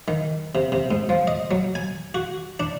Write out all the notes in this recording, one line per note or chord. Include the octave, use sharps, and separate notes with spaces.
D#3
C3
C3
G#2
F3
D#5
F#3
G#5
F#4
D4